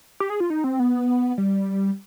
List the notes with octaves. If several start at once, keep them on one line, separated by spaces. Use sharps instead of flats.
G4
G#4
F4
D#4
C4
B3
G3